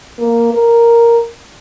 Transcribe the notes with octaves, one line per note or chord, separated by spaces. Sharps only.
A#3
A#4